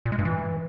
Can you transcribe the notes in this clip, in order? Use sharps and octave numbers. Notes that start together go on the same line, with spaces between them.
A#2
G#3
G2
E3